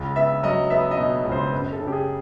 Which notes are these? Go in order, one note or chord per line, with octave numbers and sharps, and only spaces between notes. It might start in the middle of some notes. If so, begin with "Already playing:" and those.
Already playing: C#2
B3 E5
F#3 D#5
B3 E5
D#5
B2
C#2
C5
F#2 B4
A4
C#3
G4
G#4